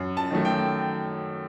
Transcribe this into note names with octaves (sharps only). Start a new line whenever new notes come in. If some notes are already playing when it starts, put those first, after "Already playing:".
Already playing: F#2
A5
D#3 F#3 A3
G5